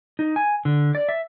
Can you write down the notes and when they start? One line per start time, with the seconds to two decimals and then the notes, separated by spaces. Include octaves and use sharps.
0.19 D#4
0.36 G#5
0.65 D3
0.95 D5
1.09 E5